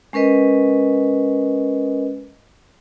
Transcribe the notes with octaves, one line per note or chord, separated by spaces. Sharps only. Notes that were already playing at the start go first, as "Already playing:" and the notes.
G#3 C#4 A#4 B4 D#5